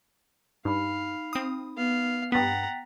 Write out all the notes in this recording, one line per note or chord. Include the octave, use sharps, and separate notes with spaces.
G2 D#4 F5 B5
C4 D#6
B3 F5
G2 B3 F#5 G5 A#5 A6 B6